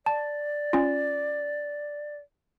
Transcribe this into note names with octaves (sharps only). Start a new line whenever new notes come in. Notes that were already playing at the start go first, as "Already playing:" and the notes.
D5 A5
C#4 F4